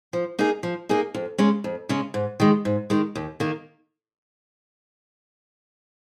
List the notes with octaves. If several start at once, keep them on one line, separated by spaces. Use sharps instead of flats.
F3
A#3 D#4 G#4
F3
A#3 D#4 G#4
F2
C#3 G#3 C#4
F2
C#3 G#3 C#4
G#2
D#3 G#3
G#2
D#3 G#3
D#2
D#3 A#3